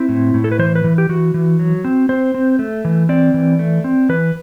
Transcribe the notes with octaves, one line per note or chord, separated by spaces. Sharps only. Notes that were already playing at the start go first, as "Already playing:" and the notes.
Already playing: C4 E4
A2
A2
A4
B4
E3 C5
B4
E3
G4
E3 F#4
E3
F#3
C4
C4 C5
C4
A3
E3
C4 D5
E3
A3
C4
E3 B4